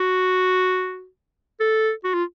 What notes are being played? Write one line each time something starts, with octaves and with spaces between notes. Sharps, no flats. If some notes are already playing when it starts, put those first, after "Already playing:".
Already playing: F#4
A4
F#4
F4